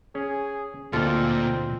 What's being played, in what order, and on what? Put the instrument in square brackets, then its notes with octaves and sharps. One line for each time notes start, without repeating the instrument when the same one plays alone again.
[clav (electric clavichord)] C#4 [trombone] G#4
[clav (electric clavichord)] D2 D#4 F5 [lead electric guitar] A#2 [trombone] C4 [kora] F4 A4